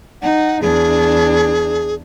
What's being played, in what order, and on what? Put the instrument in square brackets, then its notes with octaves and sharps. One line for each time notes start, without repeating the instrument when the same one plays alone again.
[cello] D#4 [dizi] F#5
[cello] E2 D4 [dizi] G#4